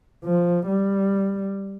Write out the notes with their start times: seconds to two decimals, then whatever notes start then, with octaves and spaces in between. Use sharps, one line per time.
0.25 F3
0.67 G3